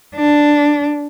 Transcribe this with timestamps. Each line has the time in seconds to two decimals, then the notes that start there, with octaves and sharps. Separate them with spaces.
0.16 D4